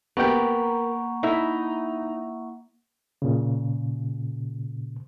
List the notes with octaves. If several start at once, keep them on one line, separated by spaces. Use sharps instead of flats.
A#3 B3 G4 A#4 F#5 G5 C#6
D#4 E4 E5
A#2 C#3